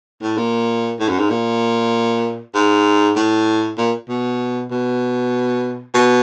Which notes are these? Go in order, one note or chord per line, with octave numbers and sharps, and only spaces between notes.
A2
A#2
A2
F#2
G#2
A#2
G#2
A2
A#2
B2
B2
B2